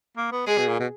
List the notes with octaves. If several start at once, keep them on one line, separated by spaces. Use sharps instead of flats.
A#3
B3
G#3 G#4
B2
A#2
B2